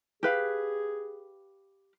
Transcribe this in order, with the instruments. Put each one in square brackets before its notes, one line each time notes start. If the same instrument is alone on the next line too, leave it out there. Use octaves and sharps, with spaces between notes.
[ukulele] G4 B4 F5 [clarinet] G#4